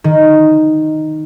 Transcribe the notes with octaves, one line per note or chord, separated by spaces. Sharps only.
D#3